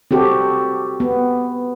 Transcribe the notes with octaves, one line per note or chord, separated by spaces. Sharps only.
C4 F#4 G4 A4
B3